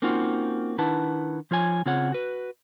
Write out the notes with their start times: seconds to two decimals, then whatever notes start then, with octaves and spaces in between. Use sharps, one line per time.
0.02 A#3 C4 C#4 D#4 F4 F#4
0.78 D#3 D4 E4 B4 F#5 A5
1.51 F3 F4 C#5 G#5
1.86 C#3 C4 F4 G#4 C#5 F#5
2.12 F#4 B4